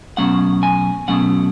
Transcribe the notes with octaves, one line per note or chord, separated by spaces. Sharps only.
B2 F#3 A3 C#4 F#5
G#5
B2 F#3 A3 C#4 F#5